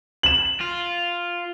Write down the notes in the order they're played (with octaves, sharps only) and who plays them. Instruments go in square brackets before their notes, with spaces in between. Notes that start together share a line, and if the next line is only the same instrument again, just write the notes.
[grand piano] E7 F#7
[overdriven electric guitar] F4